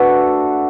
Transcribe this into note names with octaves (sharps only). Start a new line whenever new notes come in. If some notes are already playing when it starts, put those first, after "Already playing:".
Already playing: A3 D4 F#4 A4 B4